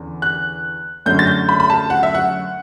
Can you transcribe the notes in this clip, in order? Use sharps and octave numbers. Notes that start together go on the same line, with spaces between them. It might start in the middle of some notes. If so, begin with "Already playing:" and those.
Already playing: E2 D3 C#4
F#6
F#2 D3 A3 C#4 G6
A6
G6
B5
B5
A5
F#5
E5
F#5